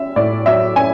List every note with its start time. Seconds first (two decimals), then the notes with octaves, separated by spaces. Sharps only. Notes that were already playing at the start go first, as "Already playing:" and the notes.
Already playing: C#4 E5
0.16 A2 D5
0.46 F#3 E5
0.76 C#4 G#5